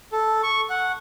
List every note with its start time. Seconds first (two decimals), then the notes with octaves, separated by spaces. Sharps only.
0.12 A4
0.43 C#6
0.70 F#5